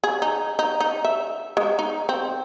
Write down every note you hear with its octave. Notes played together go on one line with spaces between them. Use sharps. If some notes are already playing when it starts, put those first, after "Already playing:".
G#4
D#4
D#4
D#4
E5
G#3
D#4
C4